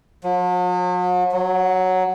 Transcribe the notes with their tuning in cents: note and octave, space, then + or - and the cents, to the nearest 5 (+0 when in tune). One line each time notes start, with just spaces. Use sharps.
F#3 -45
F#3 +0